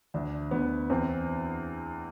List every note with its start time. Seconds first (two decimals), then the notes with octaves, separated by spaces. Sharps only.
0.14 D2 D4
0.51 D2 B3
0.90 E2 C4